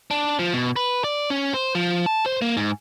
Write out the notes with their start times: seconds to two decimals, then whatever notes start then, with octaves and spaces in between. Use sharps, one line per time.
0.11 D4
0.39 F3
0.53 B2
0.76 B4
1.04 D5
1.30 C#4
1.54 C5
1.75 F3
2.06 A5
2.26 C5
2.42 A#3
2.57 G#2